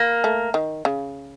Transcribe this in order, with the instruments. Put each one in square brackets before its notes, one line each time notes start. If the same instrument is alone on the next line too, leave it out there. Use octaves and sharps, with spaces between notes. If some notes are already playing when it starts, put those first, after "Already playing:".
Already playing: [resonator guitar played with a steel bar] A#3
[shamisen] A3
D#3
C#3